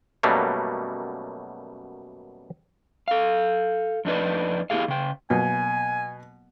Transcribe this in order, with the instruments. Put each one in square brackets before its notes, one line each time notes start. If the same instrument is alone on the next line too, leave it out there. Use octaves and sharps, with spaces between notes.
[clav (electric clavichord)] F#2 B2 F#3 G3 A3 A#3
[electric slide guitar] A4 F5
F2 D4 D#4 B4 D5
B3 E4 G4 G#4 F5
C#3 G5
[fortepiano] B2 [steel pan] F#3 A#3 B3 [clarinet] G#5